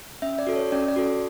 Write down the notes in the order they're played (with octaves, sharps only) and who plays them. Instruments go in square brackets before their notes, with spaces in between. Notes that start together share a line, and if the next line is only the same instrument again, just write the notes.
[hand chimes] C#4 E5
D5
F#4 A4
C#5
C#4 D5
D5
F#4 A4